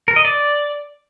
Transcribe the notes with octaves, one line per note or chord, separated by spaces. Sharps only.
A#4
D#5
D5